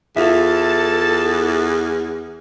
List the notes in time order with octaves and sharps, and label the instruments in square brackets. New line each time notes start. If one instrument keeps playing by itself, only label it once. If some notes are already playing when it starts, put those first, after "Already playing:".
[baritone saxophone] E2 [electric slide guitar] F4 E5 [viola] A4 A5